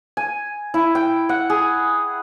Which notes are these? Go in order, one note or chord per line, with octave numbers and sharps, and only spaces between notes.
G#5
E4
G5
F#5
G#4